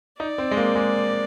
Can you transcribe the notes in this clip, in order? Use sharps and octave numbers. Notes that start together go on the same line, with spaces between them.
D#4 D5
C4
G#3
A#3
G#3